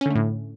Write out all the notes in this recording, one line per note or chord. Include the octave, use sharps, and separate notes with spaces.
A2 D3 A3 C#4